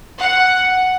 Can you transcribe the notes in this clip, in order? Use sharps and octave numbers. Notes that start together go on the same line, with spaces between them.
F#5